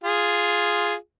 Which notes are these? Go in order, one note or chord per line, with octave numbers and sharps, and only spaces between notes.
F4 G#4